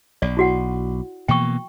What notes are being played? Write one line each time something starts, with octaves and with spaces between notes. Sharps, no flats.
B1 D5
E4 F#4 F#5
B2 E3 A#3 G5 C#6